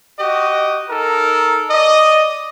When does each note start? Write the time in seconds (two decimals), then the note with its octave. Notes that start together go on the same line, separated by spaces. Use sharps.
0.18 F#4 G4 D#5
0.88 D#4 A4 A#4
1.70 D5 D#5